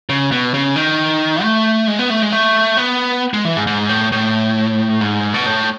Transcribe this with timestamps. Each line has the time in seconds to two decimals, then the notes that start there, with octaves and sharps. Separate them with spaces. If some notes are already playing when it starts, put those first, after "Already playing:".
0.09 C#3
0.31 B2
0.54 C#3
0.76 D#3
1.43 A3
1.88 G#3
1.99 B3
2.10 A3
2.22 G#3
2.32 A3
2.77 B3
3.34 G#3
3.45 E3
3.56 G#2
3.67 G#2
3.89 A2
4.12 A2
5.01 G#2
5.34 B2
5.46 A2